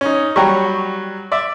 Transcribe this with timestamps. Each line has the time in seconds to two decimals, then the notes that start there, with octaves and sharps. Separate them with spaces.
0.01 C#4 D#4
0.36 F#3 G3 G5 A#5 C#6
1.32 D5 E5